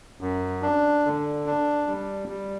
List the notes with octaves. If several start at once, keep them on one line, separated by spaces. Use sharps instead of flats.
F#2
D4
D3
D4
G3
G3